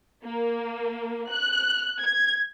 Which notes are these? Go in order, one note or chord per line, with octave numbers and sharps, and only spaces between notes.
A#3
F#6
G#6